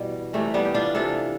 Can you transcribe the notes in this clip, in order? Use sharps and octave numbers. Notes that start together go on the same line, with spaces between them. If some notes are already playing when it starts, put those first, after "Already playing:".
Already playing: B2 E3 G3
C3 E3 G3 A3
G3 B3
G4
D4 F4
C3 E3 G3 F4 A4